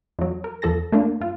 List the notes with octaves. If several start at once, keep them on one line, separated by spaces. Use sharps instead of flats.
F2 F#3
A#4
E2 F3 A4 A5 A#6
A3 A#3 D4 F4
G2 F4